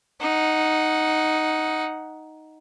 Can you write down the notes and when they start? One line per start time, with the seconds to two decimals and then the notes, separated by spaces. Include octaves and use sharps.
0.21 D#4 F#5